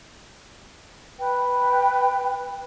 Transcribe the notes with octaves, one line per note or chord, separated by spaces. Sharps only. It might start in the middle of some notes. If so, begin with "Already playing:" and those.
B4 G5